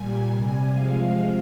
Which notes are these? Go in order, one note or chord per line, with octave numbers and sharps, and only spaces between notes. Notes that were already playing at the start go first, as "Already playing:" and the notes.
Already playing: A#2 G3 G#5
C3 G3
C3 F3 G#3 F5